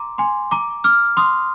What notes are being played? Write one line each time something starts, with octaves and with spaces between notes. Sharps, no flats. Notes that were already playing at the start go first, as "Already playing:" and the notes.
Already playing: A#5 C6 D6
G#5 C6
A#5 D6
D6 F6
C6 D#6